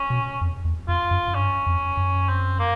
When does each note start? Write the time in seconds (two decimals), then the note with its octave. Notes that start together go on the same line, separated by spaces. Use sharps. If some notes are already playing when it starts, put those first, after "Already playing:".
Already playing: C#4
0.10 B2
0.41 F2
0.65 E2
0.88 F2 F4
1.11 F#2
1.28 F#2
1.34 G2 C#4
1.67 F2
1.97 F#2
2.29 C4
2.59 A#3